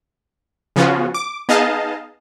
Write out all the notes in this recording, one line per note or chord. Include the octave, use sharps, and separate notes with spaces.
C#3 F3 B3 C#4 F4 F#4
D6
B3 D#4 G#4 D#5 F5 A5